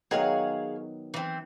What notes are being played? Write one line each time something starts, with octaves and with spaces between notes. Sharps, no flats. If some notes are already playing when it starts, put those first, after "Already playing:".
D#3 F#3 B3 G#4 C#5 F5
E3 C4